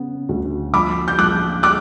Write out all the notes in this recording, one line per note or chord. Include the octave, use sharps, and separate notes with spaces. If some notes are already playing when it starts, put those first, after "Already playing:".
Already playing: C#3 B3
D2
A#1 B5 D6
G6
A#1 D6 F#6
D6 F#6